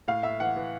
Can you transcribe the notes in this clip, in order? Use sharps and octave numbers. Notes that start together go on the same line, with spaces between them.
A2 F5
A2 E5
E3 F#5
E3